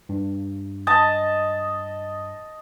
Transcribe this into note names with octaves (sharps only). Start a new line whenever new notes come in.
G2
D#5 A5